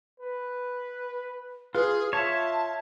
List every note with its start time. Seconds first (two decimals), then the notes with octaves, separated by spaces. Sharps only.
0.20 B4
1.75 F4 G#4 B4
2.13 F4 C#5 E5 A5